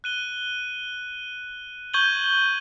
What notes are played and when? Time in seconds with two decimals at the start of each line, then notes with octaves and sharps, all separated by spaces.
0.04 F#6 D#7 G7
1.94 C#6 G6 G#6 D#7 F#7 G7